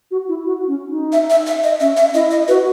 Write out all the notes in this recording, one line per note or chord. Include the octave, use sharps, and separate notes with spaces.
F#4
E4
F#4
C#4
D#4
E5
E5
E5
D#5
C#4 E5
E5
E4 D#5
D#5
F#4 B4